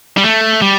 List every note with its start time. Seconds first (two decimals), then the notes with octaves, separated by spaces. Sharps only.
0.17 G3
0.24 A3
0.62 G3